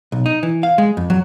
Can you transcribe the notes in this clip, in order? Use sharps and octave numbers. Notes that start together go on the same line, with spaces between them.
B1
D#4
E3
F5
G#3
F2
F#3